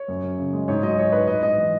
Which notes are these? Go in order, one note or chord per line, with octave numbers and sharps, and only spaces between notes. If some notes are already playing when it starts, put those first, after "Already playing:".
Already playing: C#5
F#2
F#2
C#3
G#3
G#2 C#5
F#3 D#5
F#3 C#5
G#2 B4
G#2 D#5
G#2 D#5
E3